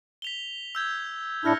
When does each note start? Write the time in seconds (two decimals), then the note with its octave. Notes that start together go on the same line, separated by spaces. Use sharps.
0.22 B6 F7 G7
0.75 E6 G6 G#6
1.45 A2 D4 E4 F6 A#6 C#7